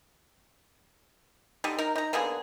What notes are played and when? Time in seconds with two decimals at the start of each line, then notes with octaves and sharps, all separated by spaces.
1.64 D3 G3 D#4
1.78 D#4 A#4 A#5
1.96 D#4 A#5
2.13 D3 A#3 B3 G#4